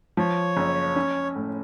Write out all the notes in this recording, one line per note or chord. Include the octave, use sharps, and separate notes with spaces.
F3 C#5
F#1
C#4
A2